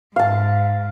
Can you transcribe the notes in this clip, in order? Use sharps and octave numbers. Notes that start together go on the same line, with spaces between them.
G#2 F5 A5